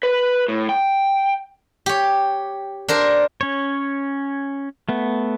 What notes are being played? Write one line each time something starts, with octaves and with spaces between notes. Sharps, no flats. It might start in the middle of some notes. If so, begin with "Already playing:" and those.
B4
A2
G5
G4 C#5
D4 A#4 C5
C#4 C#5
A3 B3